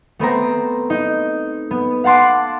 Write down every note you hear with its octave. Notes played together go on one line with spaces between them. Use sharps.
A3 B3 C4 A#5
D#4
B3
F5 F#5 A5 C6 D6